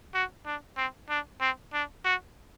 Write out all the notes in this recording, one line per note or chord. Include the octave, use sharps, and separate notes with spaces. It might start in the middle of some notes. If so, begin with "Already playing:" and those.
F#4
D4
C4
D4
C4
D4
F#4